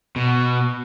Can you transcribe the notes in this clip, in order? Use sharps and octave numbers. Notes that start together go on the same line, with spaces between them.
B2